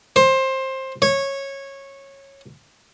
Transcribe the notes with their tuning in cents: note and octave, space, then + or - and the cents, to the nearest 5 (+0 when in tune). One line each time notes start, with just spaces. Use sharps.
C5 +20
C#5 -15